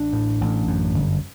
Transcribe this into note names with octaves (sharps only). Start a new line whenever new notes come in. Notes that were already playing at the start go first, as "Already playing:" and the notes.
Already playing: A1 D4
A2
A1
F#2
G1